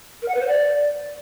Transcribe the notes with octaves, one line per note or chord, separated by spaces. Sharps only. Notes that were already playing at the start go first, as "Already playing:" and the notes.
A#4
F#5
B4
C5
D5